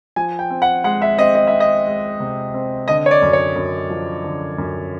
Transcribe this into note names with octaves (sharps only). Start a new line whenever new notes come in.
F3 G#5
G5
C4
F#5
G#3 F#5
E5
C4 D#5
D#5
C4 E5
D#5
G#3
C3
C4
D3 D#5
C#5
D5
F#2
C#5
F#2
F3
D3
F#2